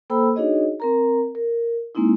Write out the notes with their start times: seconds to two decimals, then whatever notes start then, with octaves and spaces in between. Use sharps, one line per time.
0.10 A#3 A4 C5 G5 B5 E6
0.36 D4 D#4 F#4 G#4 C#5 D#5
0.80 C4 A#4 A#5
1.35 A#4
1.95 G#3 A#3 C4 D#4 E4